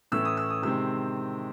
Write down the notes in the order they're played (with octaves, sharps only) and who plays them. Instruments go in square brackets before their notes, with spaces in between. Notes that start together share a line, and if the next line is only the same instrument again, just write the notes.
[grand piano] A2 E3 A3 C#4 E6
D#6
E6
D#6
C3 D#3 G#3 C4 E6